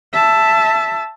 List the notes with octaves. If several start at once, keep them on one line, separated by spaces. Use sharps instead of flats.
E5 A5